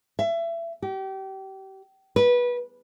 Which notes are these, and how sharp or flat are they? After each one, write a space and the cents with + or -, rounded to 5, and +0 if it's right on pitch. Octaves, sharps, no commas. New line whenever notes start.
E5 +25
G4 -30
B4 -20